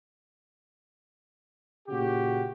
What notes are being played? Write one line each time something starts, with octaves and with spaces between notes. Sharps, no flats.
A#2 C#3 F#4 G4